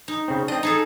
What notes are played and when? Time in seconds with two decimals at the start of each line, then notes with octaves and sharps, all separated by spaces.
0.08 D#4
0.28 C#3 C4
0.48 C4 D4 D#5
0.63 D#4 G#4 A4 A#5